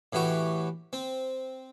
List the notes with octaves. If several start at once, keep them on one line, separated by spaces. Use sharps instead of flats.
A2 E3 F#4 G4
C4